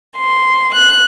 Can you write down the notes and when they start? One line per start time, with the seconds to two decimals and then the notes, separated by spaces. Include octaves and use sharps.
0.16 C6
0.73 F#6